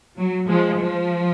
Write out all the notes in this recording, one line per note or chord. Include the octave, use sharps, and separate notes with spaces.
F#3
F3 G#3
F3